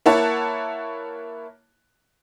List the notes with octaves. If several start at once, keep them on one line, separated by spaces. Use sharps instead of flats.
A#3 E4 C#5 F#5 A5